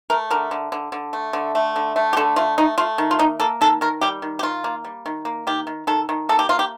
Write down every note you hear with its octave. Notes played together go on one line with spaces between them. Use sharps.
A3 A#4
D3 A#4
D3
D3
D3
A3
D3
A3
D3
A3
G4
D3 A4
A3 F4
A3 D#4
A3 F4
D#3
F4
A#3 D#4
A#3 A4
D#3 A4
D#3 A#4
G3 G4
D#3
G4
D#3 F4
A#3
G3
D#3
A#3
D#3 G4
D#3
D#3 A4
D#3
A#3 A4
G4
A#3 F4
G4